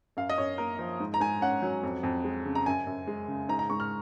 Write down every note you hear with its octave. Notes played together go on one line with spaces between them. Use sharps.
F#2 F5
D#5
F#2 C#5
A#3 A#4
F3
G#2
A#5
G#2 G#5
C#4 F#5
F#3
F2
F2
G#3
C#3
A#5
F#2 G#5
F#2
G#3
C#3
G#2 A#5
A#5
G#2 C#6
F6